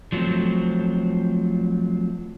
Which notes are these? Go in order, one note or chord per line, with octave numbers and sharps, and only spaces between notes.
F3 F#3 G#3 A3 C4